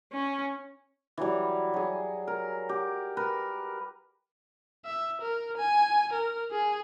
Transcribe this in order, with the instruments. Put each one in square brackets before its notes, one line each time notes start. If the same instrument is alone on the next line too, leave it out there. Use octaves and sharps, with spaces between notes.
[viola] C#4
[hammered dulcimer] E3 F#3 G3
F#3 G#4
A#4
G4
A#4 B4
[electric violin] E5
A#4
G#5
A#4
G#4